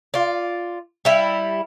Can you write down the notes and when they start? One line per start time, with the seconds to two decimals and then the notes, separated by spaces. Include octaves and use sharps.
0.14 F4 D5
1.05 G3 E4